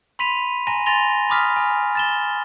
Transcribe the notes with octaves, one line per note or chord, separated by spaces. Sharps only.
B5 C6 B6 D#7 F7
G#5 A#5 C6 A#6 D#7
G#5 C6 A6 A#6 F7 G7
B5 C6 D6 D#6 F6 B6
G#5
A6 E7 G7